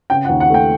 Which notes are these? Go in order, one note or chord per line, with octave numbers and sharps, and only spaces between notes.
C#3 G5
F#5
D#2
F#5
A3 G5